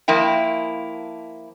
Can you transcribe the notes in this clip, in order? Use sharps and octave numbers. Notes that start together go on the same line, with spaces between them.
F3 A#3 E4 G5